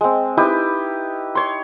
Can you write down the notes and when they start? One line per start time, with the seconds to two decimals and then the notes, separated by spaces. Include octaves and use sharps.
0.01 G#3 C4
0.37 D#4 E4 G4 B4
1.35 C#5 C6